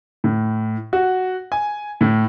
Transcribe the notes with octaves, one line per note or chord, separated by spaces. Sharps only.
A2
F#4
G#5
A2